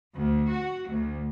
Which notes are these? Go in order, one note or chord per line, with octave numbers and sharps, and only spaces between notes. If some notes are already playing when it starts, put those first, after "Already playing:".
D2
F#4
D2